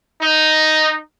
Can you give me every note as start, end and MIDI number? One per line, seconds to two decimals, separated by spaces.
0.22 0.97 63